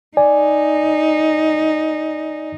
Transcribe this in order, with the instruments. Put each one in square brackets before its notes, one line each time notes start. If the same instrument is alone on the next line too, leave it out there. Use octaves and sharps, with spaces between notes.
[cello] D#4 [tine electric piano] D5 G#5